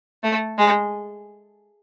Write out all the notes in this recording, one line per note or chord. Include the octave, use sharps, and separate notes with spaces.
A3
G#3